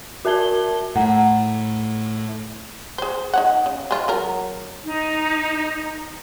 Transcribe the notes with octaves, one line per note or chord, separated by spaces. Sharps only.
F#4 A#4 E5 A5 G#6 G7
A2 F#5 A#5
G#4 C5
D#4 C#5 F#5
C#3
G#3 F4
F#3 A#4 A#5
D#4